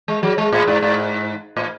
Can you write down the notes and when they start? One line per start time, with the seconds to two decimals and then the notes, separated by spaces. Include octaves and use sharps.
0.08 G#3
0.23 F#3
0.38 G#3
0.52 A2
0.67 G#2
0.83 G#2
1.57 A2